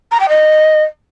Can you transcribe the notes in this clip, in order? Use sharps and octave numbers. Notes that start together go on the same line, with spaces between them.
A#5
G5
D#5